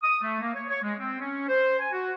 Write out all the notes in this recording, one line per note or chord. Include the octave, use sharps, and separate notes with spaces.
D#6
A3
A#3
C#5
C#5
G#3
C4
C#4
C5
G#5
F#4